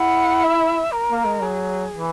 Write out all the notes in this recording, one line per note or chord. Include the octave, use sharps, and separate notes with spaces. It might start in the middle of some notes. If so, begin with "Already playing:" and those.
Already playing: E4 F#5
E5
A#4
A#3
G#3
F#3 G#4
E3